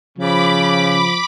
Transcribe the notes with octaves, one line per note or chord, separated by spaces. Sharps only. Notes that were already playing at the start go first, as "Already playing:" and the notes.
C#3 F3 B5 D6